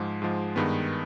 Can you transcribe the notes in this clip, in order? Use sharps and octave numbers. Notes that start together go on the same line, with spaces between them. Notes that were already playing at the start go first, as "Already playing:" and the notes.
Already playing: G#2 F3 G#3
G#2 F3 G#3
G2 D#3 G#3 B3